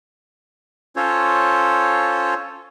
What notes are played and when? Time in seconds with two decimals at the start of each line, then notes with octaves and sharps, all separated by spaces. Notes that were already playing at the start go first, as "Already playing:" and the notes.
0.96 C#4 F4 A4 C5 C#5